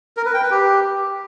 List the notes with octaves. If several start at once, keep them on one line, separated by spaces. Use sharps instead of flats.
A#4
B4
G5
B4
G4